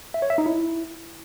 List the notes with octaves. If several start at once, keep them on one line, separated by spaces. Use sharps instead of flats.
E5
C#5
E5
D#4
E4